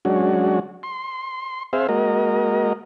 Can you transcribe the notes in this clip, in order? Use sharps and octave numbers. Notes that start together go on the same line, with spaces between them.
F#3 G#3 C#4 D4 F#4
C6
C4 G#4 C5 E5 F5
G#3 A#3 F#4 A#4 D#5